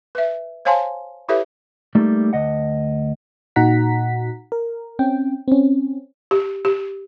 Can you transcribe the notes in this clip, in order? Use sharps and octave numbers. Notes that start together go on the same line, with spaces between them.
B4 E5
C5 C#5 F5 G#5 A5 C6
E4 G4 A4 B4 C#5 E5
G3 A3 A#3 D#4 A4
D2 D#5 F#5
A#2 D#4 F#4 F#5 A#5 B6
A#4
C4 C#4 G5
C4 C#4
G4
G4